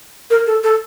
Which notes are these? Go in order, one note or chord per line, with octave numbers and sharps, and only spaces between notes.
A#4
A4
A4